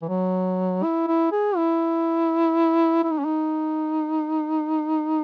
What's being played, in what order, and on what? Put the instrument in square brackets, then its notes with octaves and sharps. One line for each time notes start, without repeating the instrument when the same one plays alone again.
[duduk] E3
F#3
E4
E4
G#4
E4
E4
D#4
C#4
D#4